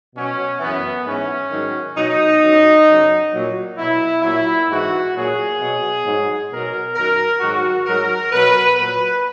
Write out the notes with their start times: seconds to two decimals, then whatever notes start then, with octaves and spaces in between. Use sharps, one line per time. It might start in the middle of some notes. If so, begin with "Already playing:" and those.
0.14 B2 F#3 C#4
0.59 F#2 E3 B3
1.05 G#2 E3 C#4
1.51 G#2 D#3 F#3
1.96 B2 F#3 D#4
2.41 F#2 D#3 F#3
2.87 F#2 C#3 F#3
3.33 A#2 F#3
3.78 B2 F#3 E4
4.22 A#2 F#3 E4
4.69 G#2 E3 F#4
5.13 A#2 F#3 G#4
5.59 B2 F#3
6.04 G#2 F#3
6.50 B2 F#3 A#4
6.95 F#2 D#3 F#3 A#4
7.40 G#2 D#3 F#3 F#4
7.86 G#2 F#3 A#4
8.31 B2 F#3 B4
8.77 A#2 F#3 B4